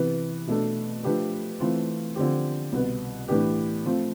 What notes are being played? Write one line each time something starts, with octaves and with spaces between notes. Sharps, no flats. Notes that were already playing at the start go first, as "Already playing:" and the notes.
Already playing: C3 E3 B3
B2 A3 D4 A4
F3 A3 D4 G4 B4
E3 A3 C4 F4
D3 F3 C4 G4
C2 B2 B3
A2 E3 B3 D4 G4
F3 A3 C4 F4